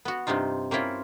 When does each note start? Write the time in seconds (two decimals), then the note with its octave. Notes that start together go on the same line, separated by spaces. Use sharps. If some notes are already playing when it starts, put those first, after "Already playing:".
0.05 B3 F#4
0.27 G2 C3 C4 D#4 F4
0.71 A#3 C4 C#4 E4 F4